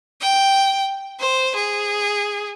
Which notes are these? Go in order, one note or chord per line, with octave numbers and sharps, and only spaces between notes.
G5
C5
G#4